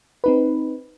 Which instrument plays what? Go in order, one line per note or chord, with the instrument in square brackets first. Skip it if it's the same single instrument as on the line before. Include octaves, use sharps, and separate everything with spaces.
[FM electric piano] C4 D#4 B4